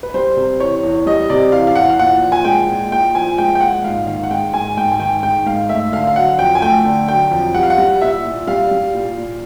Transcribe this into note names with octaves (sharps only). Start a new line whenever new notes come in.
B4
G3 C5
C3
E3 C#5
E2
G3 D#5
C3 D5
E3 F5
F5
E2 F#5
F5
A#2 F#5
F3
G#5
G#3 G5
A#2
A#2 G5
F3 G#5
G#3 G5
G5
A#2 F#5
G#2 F5
D#3 F5
F#5
G#3 G5
G#2 G#5
G#2 G5
G#5
D#3 G5
G#3 G5
G#2 F5
A3 E5
D3 F5
F5
F#3 F#5
F2 G5
G#5
A3 G5
D3
F#3 G5
F2
G3 F#5
F5
F#5
G3
A#2 E5
A#2
G3 F5
G3
A#2
A#2